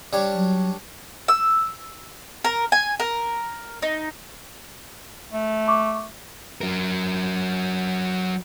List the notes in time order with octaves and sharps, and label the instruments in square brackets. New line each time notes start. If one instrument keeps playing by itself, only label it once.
[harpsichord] G3 D4 C#5
[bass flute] F#3
[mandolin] E6
A#4
G#5
A#4
D#4
[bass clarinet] A3
[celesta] C#6 D6
[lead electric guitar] F#3 A#4